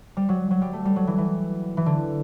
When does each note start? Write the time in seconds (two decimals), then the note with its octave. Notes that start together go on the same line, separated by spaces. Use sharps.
0.17 G3
0.29 F#3
0.51 F#3
0.62 G3
0.73 A3
0.85 G3
0.96 F#3
1.07 E3
1.18 E3
1.77 E3
1.86 D3